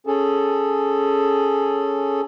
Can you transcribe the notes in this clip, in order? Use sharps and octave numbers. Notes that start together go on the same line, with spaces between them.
C#4 G#4 A4